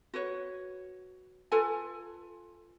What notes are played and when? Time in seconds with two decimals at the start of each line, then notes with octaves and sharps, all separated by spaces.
0.14 F#4 B4 C#5
1.52 F4 A4 B4 G#5